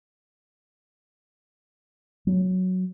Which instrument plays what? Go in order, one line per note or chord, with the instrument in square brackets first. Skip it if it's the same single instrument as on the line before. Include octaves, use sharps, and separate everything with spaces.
[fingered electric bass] F#3